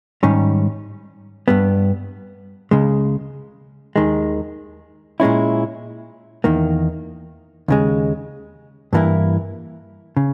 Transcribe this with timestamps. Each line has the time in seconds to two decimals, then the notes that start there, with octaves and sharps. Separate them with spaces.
0.23 G#2 D#3 G3 C#4
1.48 G2 G3 B3
2.71 C#2 C#3 G#3
3.96 D#2 D#3 G#3
5.20 A#2 G#3 C#4 E4
6.44 E2 D#3 A#3
7.68 D#2 C#3 G#3
8.93 G2 E3 A#3 E4
10.17 C#3